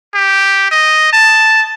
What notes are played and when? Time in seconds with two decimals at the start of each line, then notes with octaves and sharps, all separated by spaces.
0.15 G4
0.71 D#5
1.13 A5